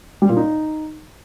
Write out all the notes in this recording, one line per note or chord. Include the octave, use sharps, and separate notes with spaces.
G3
A#2
D#4